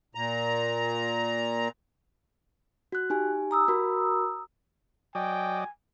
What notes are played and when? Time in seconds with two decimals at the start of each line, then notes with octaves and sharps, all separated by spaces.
0.15 A#2 A#5
2.92 F#4 F#6
3.10 D#4 G4 G#5
3.51 A#5 D#6 E6
3.68 F#4 A#4 B5
5.15 F#3 D5 D#5 G5 G#5